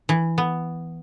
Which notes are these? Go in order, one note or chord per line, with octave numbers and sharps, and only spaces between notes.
E3
B3